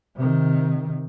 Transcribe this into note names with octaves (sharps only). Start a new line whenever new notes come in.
C3 D#3